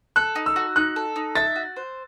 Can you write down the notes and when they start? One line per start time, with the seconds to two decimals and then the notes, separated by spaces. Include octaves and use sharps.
0.16 A4 F#6
0.36 D#4
0.46 E6
0.56 F#4
0.76 D#4 F#6
0.96 A4
1.16 D#4
1.35 E5 A6
1.56 F#4
1.76 C5